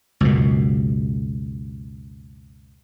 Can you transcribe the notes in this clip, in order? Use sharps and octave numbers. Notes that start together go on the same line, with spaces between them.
C#2 F#2 B2